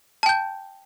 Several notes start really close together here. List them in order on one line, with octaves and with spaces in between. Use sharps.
A5 G5 G6